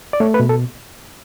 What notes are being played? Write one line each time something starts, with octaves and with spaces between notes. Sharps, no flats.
D5
A3 C#5
B4
B2
A4